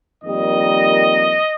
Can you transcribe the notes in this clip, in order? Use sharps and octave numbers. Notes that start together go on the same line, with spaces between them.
F2 D#3 G3 A#3 D#5